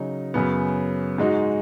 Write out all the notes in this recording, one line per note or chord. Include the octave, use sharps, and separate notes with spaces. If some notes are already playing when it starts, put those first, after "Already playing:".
Already playing: C#3 F#3 D#4
F#2 C#3 B3
G#2 G#3 D#4 F#4